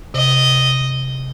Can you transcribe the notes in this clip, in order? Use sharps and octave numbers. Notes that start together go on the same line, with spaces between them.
C3 D#5